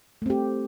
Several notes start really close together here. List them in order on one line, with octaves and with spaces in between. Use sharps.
A3 C4 G4